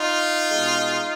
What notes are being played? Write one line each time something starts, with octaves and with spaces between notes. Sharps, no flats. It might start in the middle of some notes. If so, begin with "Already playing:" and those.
Already playing: D#4 F4
B2 G#3